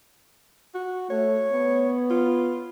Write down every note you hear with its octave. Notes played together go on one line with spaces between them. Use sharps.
F#4
A3 C#5
B3
F4